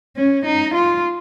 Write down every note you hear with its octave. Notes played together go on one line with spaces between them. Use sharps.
C#4
D#4
F4